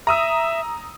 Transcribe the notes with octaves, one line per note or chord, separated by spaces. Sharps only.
E5 A#5 D#6 E6